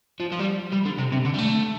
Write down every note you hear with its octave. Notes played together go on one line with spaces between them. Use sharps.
F3
F3
G3
G3
D3
C3
C3
D3
G3
A3